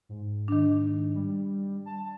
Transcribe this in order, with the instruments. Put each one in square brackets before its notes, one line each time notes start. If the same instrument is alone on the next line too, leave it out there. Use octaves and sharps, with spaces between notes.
[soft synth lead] G#2
[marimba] D#3 D4
[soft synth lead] G3
A5